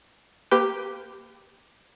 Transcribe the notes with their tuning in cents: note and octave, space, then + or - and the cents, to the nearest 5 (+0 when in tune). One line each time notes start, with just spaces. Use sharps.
A#3 +0 G4 +0 B4 +35